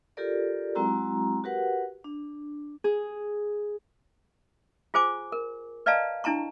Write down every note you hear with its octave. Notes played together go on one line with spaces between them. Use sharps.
F4 G4 A4 A#4 D5
F#3 G#3 C4 E4 F#4 A#5
F#4 G4 A#4 B4 F#5
D4
G#4
F4 G#4 C5 G#5 D6
A#4
B4 D5 D#5 F5 A5 A#5
D4 E4 A5 A#5 C#6